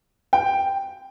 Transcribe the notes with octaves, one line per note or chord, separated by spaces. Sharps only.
G5